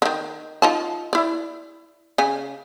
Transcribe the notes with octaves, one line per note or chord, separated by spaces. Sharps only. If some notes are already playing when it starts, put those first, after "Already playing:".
D3 D#3
D#4 F4 A5
E4 D5
C#3 G#5